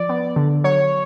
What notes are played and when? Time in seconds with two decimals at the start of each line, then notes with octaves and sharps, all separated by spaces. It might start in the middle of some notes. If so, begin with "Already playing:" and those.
Already playing: F3 D5
0.09 B3
0.36 D3
0.64 F#3 C#5